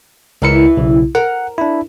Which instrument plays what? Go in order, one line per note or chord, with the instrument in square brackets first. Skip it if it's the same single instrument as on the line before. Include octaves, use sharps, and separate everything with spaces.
[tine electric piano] C#2 A#4 C#7 [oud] E3 E4
[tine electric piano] B1 C#3
[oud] A#4 [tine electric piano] F#5
[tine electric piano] D4 E4